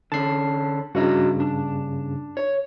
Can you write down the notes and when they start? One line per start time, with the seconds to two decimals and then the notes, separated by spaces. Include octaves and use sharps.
0.12 D3 C#4 A5 C7
0.95 G2 C#3 F#4 D#5 E5
1.40 D4
2.37 C#5